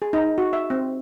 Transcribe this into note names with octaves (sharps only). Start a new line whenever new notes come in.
G#4
D#4
F#4
E5
C4